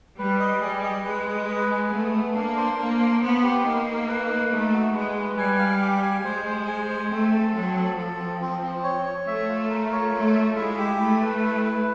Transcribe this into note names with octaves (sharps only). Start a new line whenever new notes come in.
G3 B4
D#5
G3 G#4
D#5
G#3 B4
D#5
B4
G#4
A3 B3
B3
A#3 D4
C5
A#3 D4
C5
B3 C5
G4
A#3 D#4
D#4
B4
D#4
A3 D#4
F#4
G#3 B4
B4
G3 G#5
F5
G4
G#5
G#3 C5
C5
G#5
C5
A3 C4
A4
F#3 C4
A4
F3 A4
C4
C4
C4
C#5
C#5
A3 E5
F4
A#4
C#5
A3 F4
E5
G#3 E4
G4
A3 E4
B4
E4
B4